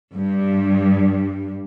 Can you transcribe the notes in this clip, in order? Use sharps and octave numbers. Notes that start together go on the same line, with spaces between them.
G2